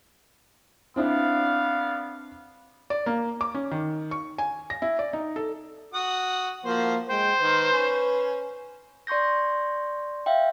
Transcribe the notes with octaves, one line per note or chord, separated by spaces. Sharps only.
B3 C4 D4 E4 D5 F5
D5
A#3
D6
C#4
D#3
C#6
G#5
A#6
E4
D5
D#4
A4
F#4 F#5 D#6
F3 A#3 F#4 C5
G#3 C5 G5
D#3 B4
C#4
D5 C6 C#6 G6 A#6
E5 F5 G5